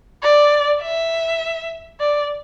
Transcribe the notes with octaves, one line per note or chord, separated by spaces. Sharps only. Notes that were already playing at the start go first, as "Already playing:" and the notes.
D5
E5
D5